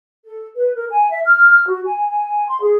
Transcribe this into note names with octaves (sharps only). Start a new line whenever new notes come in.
A4
B4
A#4
G#5
E5
F6
F#4
G#5
G#5
C6
G#4